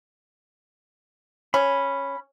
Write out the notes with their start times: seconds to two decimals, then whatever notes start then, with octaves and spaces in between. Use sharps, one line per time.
1.54 C#4 B5